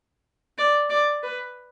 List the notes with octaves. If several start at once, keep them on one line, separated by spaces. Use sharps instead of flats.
D5
D5
B4